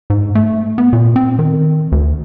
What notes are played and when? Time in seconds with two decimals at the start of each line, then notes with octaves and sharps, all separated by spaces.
0.10 G#2
0.35 A3
0.78 B3
0.93 A#2
1.16 C4
1.39 D#3
1.92 D2